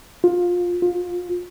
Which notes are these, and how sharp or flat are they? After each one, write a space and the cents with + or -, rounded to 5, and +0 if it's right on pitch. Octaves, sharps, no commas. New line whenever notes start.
F4 +20
F4 +25